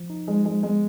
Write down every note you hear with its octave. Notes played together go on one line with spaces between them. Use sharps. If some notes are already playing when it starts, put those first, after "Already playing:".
Already playing: F3
D#4
F3 G#3
F3 G#3
G#3 B3